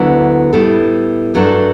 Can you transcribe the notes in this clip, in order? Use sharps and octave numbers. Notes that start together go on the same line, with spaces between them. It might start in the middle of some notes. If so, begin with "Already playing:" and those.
Already playing: D2 D3 F#3 B3 E4
A2 G3 B3 E4 A4
G2 F#3 A3 D4 A4